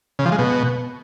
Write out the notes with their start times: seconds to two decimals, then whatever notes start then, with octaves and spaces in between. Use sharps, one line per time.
0.19 C#3
0.25 F3
0.32 G#3
0.39 B2